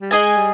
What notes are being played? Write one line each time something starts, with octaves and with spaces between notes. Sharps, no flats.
G3
G#3 G#4 D#5 G#5
G3